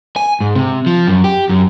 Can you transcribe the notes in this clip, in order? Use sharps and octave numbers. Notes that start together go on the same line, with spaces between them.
G#5
G#2
C3
F3
F#2
G4
F#2